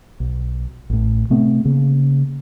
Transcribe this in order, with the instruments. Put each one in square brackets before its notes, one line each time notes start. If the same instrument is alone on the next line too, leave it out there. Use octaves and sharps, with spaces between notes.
[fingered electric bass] B1
A1 A2
C3 A3 B3 C4
C#3 A#3